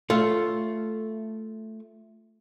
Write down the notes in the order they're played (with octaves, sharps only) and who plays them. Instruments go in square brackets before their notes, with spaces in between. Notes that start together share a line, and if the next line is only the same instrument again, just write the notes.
[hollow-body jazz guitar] A3 C#5 [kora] F4